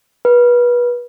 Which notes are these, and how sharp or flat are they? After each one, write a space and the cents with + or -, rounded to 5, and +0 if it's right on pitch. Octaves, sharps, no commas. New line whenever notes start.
B4 -30